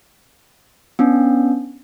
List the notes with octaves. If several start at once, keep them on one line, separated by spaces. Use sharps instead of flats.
B3 C#4 D4